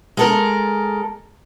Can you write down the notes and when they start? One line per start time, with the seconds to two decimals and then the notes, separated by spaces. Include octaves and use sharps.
0.17 G#3 A4 A#4